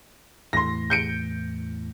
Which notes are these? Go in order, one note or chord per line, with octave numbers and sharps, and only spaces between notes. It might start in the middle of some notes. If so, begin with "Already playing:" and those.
E2 A2 E3 C6 A#6
G6 C#7 D7